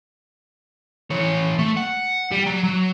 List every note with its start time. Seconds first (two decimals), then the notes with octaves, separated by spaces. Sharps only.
1.10 E3 C#5
1.59 A3
1.77 F#5
2.32 G3
2.47 F#3
2.64 F#3